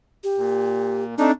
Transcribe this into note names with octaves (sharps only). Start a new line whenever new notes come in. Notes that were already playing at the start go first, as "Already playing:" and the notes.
G4
A#2
A3 C4 D4 D#4